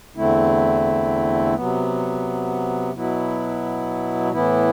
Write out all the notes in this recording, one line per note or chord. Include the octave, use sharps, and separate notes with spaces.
E2 D3 A3 C4 E4
C3 F#3 B3
B2 F#3 B3 E4
A2 E3 B3 E4